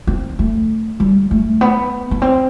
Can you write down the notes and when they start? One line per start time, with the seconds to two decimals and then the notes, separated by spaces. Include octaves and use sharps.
0.07 C4
0.39 A3
1.00 G3
1.31 A3
1.61 B3
2.11 B3
2.22 C4